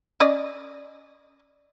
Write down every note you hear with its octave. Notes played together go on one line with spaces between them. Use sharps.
C#4 D5 D#5